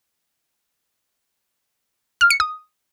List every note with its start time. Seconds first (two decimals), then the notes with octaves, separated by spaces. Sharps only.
2.21 F6
2.30 C#7
2.40 D#6